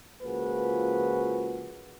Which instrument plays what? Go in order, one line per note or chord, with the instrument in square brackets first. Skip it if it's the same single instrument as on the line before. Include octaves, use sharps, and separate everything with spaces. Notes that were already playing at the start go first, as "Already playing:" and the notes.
[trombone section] C#2 F3 A#3 F#4 G#4 B4